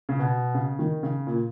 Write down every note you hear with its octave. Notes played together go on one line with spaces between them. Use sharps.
C#3
B2
C#3
D#3
C#3
A#2